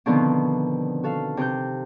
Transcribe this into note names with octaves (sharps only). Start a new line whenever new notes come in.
B2 D3 D#3 F3 B3 C4
F#4 A4 F5
C3 G4 G6